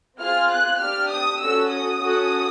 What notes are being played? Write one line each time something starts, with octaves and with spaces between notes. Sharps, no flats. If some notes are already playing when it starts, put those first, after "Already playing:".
C4 F4 G#4 F6
F#6
D4 G4 F6
D#6
C#4 F#4 A4 E6
D#6
C#4 F#4 A4